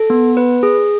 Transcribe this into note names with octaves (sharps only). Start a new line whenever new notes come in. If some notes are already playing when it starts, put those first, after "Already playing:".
Already playing: A4
B3
B4
G#4